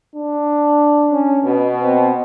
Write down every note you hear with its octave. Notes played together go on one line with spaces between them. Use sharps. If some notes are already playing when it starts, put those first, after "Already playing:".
D4
C#4
B2
C4